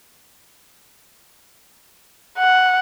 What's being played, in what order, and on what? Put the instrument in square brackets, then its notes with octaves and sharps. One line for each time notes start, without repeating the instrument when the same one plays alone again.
[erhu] F#5